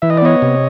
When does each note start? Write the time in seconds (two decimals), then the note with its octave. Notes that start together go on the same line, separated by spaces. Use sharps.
0.02 E3 E5
0.10 D#5
0.17 D5
0.22 B3 C#5 D#5
0.42 C3